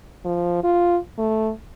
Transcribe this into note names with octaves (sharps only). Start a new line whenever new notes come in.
F3
F4
A3